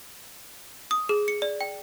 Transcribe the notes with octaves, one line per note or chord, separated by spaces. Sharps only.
D#6
G#4
C#7
D5
G5